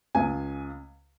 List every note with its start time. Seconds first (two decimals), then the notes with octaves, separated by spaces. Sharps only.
0.15 C#2 C#3 G#5